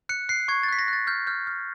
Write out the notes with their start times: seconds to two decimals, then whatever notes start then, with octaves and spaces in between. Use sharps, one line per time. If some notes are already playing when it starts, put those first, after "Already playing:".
0.09 F#6 C#7
0.29 F#6 C7
0.48 C#6 G#6
0.63 A6
0.69 F#6 B6
0.79 A#6
0.88 F#6 A6
1.07 F6 G6
1.27 F6 G6
1.47 F6